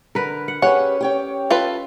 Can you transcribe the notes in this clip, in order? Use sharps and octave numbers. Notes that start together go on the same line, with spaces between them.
D3 A#4 B4
F#5
C#4 G4 G#4 B4 F#5
G4 C#5 G5
F4 A4 B4